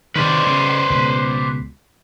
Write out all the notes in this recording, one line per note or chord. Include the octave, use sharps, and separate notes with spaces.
C3 D#3 B4 C5 D5
C#3
C#2 B2